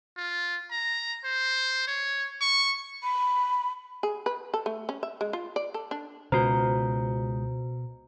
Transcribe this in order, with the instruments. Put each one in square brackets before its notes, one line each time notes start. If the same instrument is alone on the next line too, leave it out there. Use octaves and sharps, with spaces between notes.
[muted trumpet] F4
A#5
C5
C#5
C#6
[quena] B5
[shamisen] G#4
B4
A4
A3
C#4
E5
G#3
F4
D5
A4
D4
[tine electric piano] C#2 D#6 G6 [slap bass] B2 [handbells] F#4 C5 [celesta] A#5